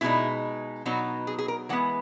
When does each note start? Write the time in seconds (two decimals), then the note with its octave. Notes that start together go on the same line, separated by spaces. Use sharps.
0.01 B2 G#3 D#4 E4
0.85 B2 F#3 B3 D#4 F#4
1.27 G#4
1.39 G#4
1.48 A#4
1.69 E3 G#3 B3 F#5